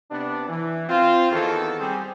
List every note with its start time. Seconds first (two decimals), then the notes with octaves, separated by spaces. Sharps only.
0.11 C3 B3 D4
0.49 E3
0.89 C4 F4
1.31 E2 D#3 F3 F#4 A4
1.80 G3 C4 G4 G#4